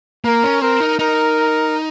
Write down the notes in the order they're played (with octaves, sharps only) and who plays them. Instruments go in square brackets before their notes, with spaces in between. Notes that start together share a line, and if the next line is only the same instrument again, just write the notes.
[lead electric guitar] A#3 [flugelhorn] A#4
[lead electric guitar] C#4
[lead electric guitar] C4 [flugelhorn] A#4
[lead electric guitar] D#4
[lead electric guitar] D#4 [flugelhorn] A#4